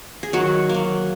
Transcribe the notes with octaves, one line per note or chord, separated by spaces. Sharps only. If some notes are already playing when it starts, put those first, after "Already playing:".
G#4
D#3 F#3 F#4
F#3 A#3